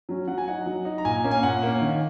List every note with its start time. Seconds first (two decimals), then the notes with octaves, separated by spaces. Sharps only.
0.09 F#3 C#4
0.28 F#3 F#5
0.38 G#5
0.48 D#4 F#5
0.66 F#3
0.85 D#4
0.98 A#5
1.05 A#2 G#5
1.24 A#3 C#4
1.31 G#5
1.43 A#2 F#5
1.63 A#3 C#4
1.81 D#3